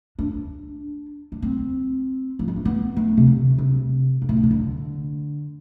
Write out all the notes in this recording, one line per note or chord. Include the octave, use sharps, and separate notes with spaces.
D4
D4
C4
F3
G#3
A3
B3
A3
C3
D3
C3
G#2
A2
B2
C3
D3